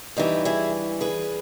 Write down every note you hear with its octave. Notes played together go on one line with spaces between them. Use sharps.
G2 E3 D#4 G4
E4 G#4
G#4 B4